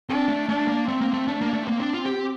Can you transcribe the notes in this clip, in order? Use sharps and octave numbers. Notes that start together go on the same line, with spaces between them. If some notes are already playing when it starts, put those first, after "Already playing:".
C4 D4
A3
A3 D4
A#3
A3 C4
A#3
A3
A3 D4
A#3
A3
A#3 C4
D4
F4
G4